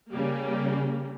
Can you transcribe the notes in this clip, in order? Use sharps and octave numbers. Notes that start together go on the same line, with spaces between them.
C#3 G3 A#3